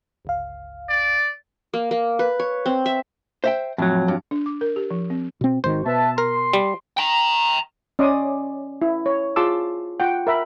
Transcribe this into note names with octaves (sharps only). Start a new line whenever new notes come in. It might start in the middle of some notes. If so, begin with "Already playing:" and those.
G1 C#2 F5
D5
A#3
A#3
B4
C#5
C4
E5
C5 E5 G5
F2 A2 F#3
G2
D4
D6
A#4
G4
F3
C4
B2 C4
G#1 D#3 F#4 C5
B2 B4 E5 A5
A#4 C6
G3
G5 A#5
C#4 D5 D#5 C6 D6 D#6
E4
C#5
F4 G#4 A5 C6 D6 E6
F4 F#5 G5
A#4 E5 B5